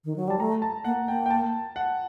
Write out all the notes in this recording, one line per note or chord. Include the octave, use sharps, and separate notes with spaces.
D#3
F#3
G3 A5
A3 A#5
A5
A#3 F#5
A#3 G5
G5
A5
F#5